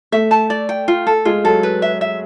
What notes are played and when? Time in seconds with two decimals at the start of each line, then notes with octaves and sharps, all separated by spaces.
0.12 A3 E5
0.31 A5
0.50 D5
0.69 G5
0.88 F4
1.07 A4
1.25 G#3 F4
1.44 F#3 A4
1.63 B4
1.82 E5
2.01 E5